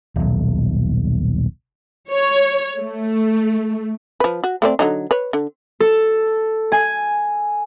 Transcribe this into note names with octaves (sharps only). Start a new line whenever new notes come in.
D#1 B1
C#5
A3
F3 B4
F#4
A3 C4 D5
D3 F#3 D#4
B4 C#5
D3
A4
G#5